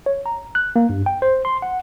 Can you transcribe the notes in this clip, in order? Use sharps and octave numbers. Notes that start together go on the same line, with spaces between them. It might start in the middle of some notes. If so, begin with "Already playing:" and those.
C#5
A#5
F#6
A#3
G2
G5
C5
C6
F#5